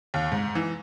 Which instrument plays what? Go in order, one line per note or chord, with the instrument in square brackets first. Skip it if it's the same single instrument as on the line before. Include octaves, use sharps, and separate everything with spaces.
[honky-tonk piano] D#2
G#2
E3